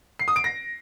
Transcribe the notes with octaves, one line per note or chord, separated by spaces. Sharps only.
C7
D#6
D7
A#6